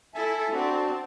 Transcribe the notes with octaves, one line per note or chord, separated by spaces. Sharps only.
E4 A4 E5 G#5 A5
C4 D4 F#4 A5